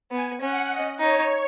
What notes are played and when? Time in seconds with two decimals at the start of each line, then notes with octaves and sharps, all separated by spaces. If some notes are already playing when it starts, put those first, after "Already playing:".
0.11 B3 G#5
0.41 C#4 F#5
0.70 D#5
1.00 D#4 C#5